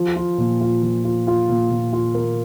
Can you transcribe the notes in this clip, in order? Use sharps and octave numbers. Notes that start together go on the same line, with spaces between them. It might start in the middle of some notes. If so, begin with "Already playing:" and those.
Already playing: F3
F4
A#2
F4
F3
F4
F4
A#2
A#2
F4
A#3